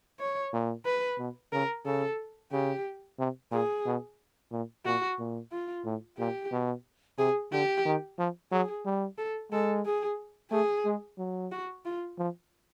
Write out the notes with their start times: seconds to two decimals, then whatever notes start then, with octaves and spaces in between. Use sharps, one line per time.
0.20 C#5
0.53 A#2
0.85 B4
1.18 B2
1.52 C#3 A#4
1.86 C#3 A4
2.52 C#3 G4
3.19 C3
3.52 A#2 G#4
3.86 B2
4.52 A#2
4.85 A#2 F#4
5.19 A#2
5.52 F4
5.85 A2
6.18 A#2 G4
6.52 B2
7.18 C3 G#4
7.52 D3 G4
7.86 D#3
8.19 F3
8.52 F#3 G#4
8.85 G3
9.18 A4
9.52 G#3 A4
9.85 G#4
10.51 A3 G#4
10.85 G#3
11.18 F#3
11.52 F#4
11.85 F4
12.18 F3